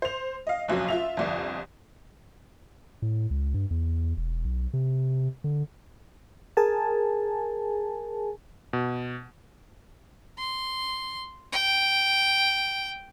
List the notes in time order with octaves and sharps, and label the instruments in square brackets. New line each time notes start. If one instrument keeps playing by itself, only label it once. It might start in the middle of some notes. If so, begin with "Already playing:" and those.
[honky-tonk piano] C5 F7
D#5 F5
F#1 B1 F2 F#3
F4 E5 F7
G1 C2 F2
[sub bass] A2
C#2
G2
E2
E1
B1
C3
D3
[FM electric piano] G#4 A#4 G#5 A5
[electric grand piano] B2
[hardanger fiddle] C6
G5